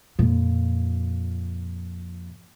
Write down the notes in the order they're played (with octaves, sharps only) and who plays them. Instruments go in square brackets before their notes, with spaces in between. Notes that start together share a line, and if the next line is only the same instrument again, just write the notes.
[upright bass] F2 A#2